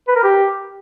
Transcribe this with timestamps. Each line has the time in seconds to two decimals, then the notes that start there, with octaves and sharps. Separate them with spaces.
0.08 B4
0.16 A#4
0.24 G4